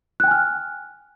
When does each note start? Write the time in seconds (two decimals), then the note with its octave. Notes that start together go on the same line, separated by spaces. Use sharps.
0.20 F#6
0.24 G5
0.27 G#5
0.31 F6